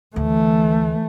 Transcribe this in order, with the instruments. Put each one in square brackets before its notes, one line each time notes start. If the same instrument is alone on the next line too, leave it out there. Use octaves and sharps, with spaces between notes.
[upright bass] D2 [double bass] E3 A3